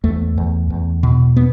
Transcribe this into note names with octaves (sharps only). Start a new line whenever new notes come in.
E2 A3
E2
E2
B2
B3